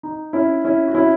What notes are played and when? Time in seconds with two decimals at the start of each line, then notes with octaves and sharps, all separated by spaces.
0.03 D#4
0.33 C#4 E4
0.65 C#4 E4
0.87 F#4
0.95 C#4 E4